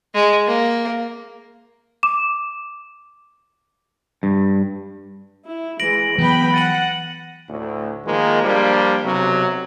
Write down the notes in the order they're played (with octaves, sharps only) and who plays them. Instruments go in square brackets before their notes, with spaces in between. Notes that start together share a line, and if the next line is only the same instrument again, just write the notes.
[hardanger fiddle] G#3
A#3
[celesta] D6 E7
[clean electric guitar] G2
[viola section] E4
[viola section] E3 G#3 [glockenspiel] A#6 D7 F#7
[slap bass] E3 F#3 [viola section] B3 G5 B5
[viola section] F#5 [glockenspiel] A6 D#7 F#7
[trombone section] D2 A2
D#3 F3 G#3 A#3
F3 G3 A#3 D4
B1 C3 F#3